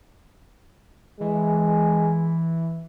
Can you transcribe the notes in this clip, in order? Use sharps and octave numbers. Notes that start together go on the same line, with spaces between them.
E3 G#3